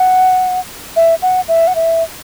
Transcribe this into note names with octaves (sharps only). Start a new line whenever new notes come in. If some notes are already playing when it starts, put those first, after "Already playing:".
Already playing: F#5
E5
F#5
E5
F#5
E5